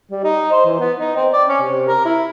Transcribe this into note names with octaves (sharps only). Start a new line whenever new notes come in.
G3
D#4
C5
E3
B3
D#4
C4
D5
C#4
C3
A#4
E4